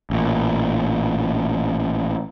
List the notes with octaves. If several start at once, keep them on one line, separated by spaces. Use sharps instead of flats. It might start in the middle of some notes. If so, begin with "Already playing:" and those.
A1 A#2